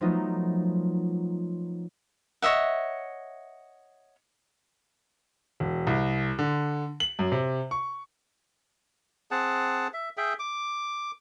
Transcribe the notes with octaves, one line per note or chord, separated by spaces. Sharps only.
F3 F#3 A3 B3 D#4 F4
C#5 D#5 E5 F#5
E1
C2
D3
F#7
F#2
C3
C#6
C4 G#4 F#5 A5
E5
G#4 E5 G5
D6